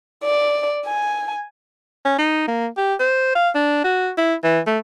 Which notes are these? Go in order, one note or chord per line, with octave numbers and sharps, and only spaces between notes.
D5
G#5
C#4
D#4
A#3
G4
C5
F5
D4
F#4
E4
E3
A3